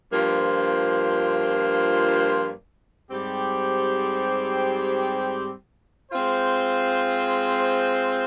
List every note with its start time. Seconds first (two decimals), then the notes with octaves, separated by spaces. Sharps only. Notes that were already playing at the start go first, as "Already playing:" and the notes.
0.10 G2 F3 A#3 F4 C5
3.11 G#2 G3 C4 G4
6.12 G#3 C4 F4 C5